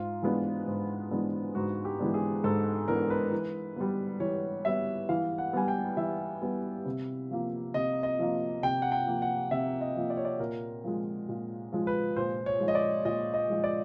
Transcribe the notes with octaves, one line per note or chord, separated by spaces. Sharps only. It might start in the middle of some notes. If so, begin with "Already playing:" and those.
Already playing: G#2 F4
E3 G#3 B3 D4
G#2
E3 G#3 B3 D4
G#2 F#4
G4
E3 G#3 B3 D4
G#4
G#2 A4
E3 G#3 B3 D4 A#4
B4
E3
G3 B3
E3 C#5
G3 B3 E5
E3 F5
F#5
G3 B3 G#5
G5
E3 E5
G3 B3
C3
F3 A#3
C3 D#5
D#5
F3 A#3
C3 G5
F#5
G5
F3 A#3
F#5
C3 E5
D#5
F3 A#3
D5
C#5
D5
A#2 A#4
F3 G#3
A#2
F3 G#3
B4
A#2 C5
C#5
F3 G#3
D#5
D5
A#2 D#5
D#5
F3 G#3
D5